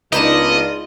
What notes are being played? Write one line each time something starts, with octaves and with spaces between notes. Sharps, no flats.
C#2 A#3 B3 D4 D#4 F4 D#5 E7